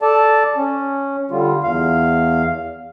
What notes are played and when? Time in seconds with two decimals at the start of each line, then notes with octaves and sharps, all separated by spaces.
0.02 A4 D5 A5
0.57 C#4
1.31 D3 G3 F4
1.63 E2 F5